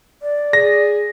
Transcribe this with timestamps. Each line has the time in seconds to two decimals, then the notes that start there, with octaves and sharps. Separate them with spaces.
0.22 D5
0.53 G#4 A#6